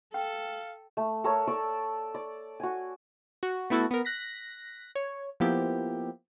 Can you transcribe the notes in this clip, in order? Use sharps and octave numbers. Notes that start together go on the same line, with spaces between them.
A4 F5 G5
A3
A4 A#4 C#5
D5 A5 C#6 E6
D5
F#4 G#5
F#4
A3 B3 E4 F#4 A4
B3 A#4
F#6 A#6 B6
C#5
F3 A#3 B3 E4 G4